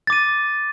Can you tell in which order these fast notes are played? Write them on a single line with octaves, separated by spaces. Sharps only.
A6 D6 D#7